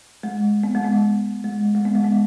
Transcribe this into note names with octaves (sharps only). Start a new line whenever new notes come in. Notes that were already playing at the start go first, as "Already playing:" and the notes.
G#3
B3
G#3
B3
G#3
G#3
B3
G#3
B3